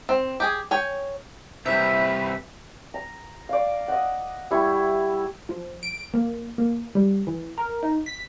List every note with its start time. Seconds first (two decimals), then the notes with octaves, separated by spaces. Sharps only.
0.09 C4
0.40 G4 G#4 G#5
0.71 C#5 G5 G#5
1.66 C3 E3 G3 B4 E5
2.94 A#5
3.49 D5 F5
3.88 D#5 F#5
4.51 G3 E4 C#6
5.49 F3
5.83 D7
6.14 A#3
6.58 A#3
6.95 G3
7.27 E3
7.58 A#4
7.83 D#4
8.06 B6